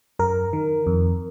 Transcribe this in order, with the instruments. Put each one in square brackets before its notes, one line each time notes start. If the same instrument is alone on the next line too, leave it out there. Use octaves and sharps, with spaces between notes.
[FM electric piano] F#2 A#4
D#3
F2